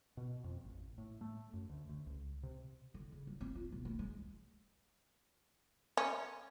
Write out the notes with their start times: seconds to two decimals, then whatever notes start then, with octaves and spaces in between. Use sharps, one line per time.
0.17 B2
0.44 F2
0.65 A1
0.98 A2
1.21 A3
1.53 F#2
1.70 D2
1.89 D2
2.07 C#2
2.43 C3
2.94 D3
3.12 C#3
3.27 F#3
3.41 C4
3.55 F4
3.72 B1
3.85 A3
3.99 G#3
5.97 C#4